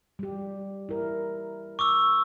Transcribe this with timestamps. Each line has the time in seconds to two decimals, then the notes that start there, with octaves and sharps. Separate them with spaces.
0.19 G3 G4
0.89 E4 A#4
1.79 C#6 D6 E6